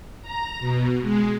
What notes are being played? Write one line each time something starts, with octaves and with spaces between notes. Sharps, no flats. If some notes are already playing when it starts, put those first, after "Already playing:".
A#5
B2
G#3